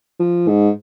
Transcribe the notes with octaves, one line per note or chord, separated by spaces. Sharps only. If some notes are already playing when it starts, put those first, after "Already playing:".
F3
G#2